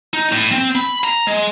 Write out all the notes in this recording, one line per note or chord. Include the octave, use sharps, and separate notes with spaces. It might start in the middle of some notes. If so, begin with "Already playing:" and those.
D#4
A2
C4
B5
A#5
G#3